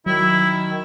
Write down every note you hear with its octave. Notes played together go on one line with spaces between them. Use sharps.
D#3 F#3 E4